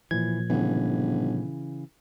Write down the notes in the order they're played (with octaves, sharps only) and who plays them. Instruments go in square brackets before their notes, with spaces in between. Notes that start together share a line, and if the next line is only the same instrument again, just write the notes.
[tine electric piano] A#2 F3 G#6 [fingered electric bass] E3
[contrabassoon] G1 [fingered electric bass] C#3 E3